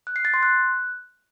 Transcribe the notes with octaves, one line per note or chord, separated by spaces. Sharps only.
F#6
C7
A6
C6
F#6